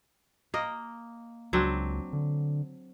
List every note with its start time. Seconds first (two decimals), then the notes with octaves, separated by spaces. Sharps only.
0.54 A#3 D#5
1.53 C#2 F#3 C4 D4
2.13 D3